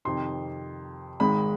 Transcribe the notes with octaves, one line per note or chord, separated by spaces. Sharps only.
F2 C3 D#3 C6
G#1 G#2 D#3 G#3 B5